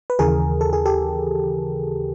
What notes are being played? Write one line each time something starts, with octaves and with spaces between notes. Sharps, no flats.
B4
D#2 C#3 E3 G#4 A#4
A4
G#4
G4 A4